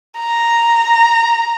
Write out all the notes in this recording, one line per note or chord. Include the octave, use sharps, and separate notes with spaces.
A#5